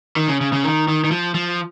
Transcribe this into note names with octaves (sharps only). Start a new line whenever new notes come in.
D#3
C#3
C#3
C#3
D#3
D#3
D#3
F3
F3